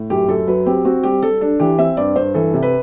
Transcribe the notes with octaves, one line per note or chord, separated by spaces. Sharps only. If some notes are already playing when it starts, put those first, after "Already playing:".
Already playing: A2
F#2 G4
F#2 A4
F#3 B4
C4 G4
C4 F#4
G3 G4
G3 A4
D4 A4
E3 G4
C4 E5
G2 D5
G2 C5
E3 A4
C3
B4